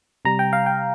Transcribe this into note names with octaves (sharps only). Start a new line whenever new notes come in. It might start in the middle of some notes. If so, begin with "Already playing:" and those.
C3 G3 A#5
G5
F5
G5